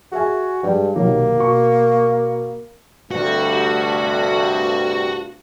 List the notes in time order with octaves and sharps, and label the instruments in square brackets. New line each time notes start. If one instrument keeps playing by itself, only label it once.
[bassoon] F#4 [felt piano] G#4 E5 G#5
[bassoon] G2 [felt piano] G3 G#3 G5
[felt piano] B1 C3 D#3 [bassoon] A#3
[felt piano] B2 C#6
[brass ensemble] D2 G2 C3 [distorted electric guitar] F#4